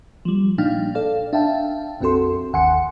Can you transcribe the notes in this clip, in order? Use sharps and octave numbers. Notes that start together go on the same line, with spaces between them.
F3 G3
A#2 D4 D#4 F5 G5 F6
A4 D5 F5
D4 E5 F5 G5 A5
A#1 F2 C4 F#4 A4 C6
G1 D#2 F#5 G#5 C6 C#7